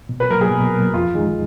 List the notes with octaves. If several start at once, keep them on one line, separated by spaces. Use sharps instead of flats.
B2
B4
F#3 A#3 A#4
G#4
B2
F#3 A#3
F2 F4
D#3 G#3 D#4 G#4